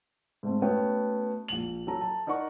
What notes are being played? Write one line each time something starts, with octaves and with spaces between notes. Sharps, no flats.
G#2 A3 C4
A3 B3 C#4 F#4 C#5 G5
A#1 F#7
F#3 A4 A#5
A5
D#4 A#4 D5 F#5 C#6